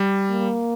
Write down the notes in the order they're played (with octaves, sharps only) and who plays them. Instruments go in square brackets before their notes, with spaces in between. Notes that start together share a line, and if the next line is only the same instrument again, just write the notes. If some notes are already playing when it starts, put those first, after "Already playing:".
Already playing: [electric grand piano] G3
[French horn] A#3